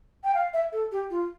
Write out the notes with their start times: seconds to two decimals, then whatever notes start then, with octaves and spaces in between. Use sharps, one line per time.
0.24 G5
0.35 F5
0.54 E5
0.72 A4
0.92 G4
1.10 F4